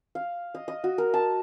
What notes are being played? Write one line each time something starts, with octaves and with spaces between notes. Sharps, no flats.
F5
D#5
D#5
F#4
A#4
A5